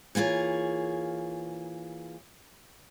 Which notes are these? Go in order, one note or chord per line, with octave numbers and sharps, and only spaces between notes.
E3 A#3 F4 G#4 C#5